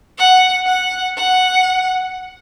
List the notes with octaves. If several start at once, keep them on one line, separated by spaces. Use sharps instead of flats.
F#5
F#5
F#5